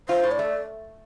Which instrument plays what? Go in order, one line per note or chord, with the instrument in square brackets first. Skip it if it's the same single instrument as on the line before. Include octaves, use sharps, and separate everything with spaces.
[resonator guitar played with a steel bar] F4 [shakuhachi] C5
[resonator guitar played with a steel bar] A2
[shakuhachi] D5
[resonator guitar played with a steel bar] A3